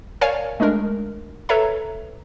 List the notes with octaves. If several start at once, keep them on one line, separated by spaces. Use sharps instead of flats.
A#4 C#5 D5 F5 G#5
G#3 A3 D4 A#4
A4 B4 C#5 E5 A#5